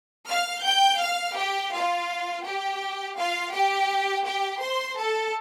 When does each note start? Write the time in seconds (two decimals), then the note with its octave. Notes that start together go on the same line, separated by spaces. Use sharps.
0.28 F5 F6
0.64 G5 G6
1.00 F5 F6
1.36 G4 G5
1.73 F4 F5
2.44 G4 G5
3.17 F4 F5
3.53 G4 G5
4.25 G4 G5
4.61 C5 C6
4.97 A4 A5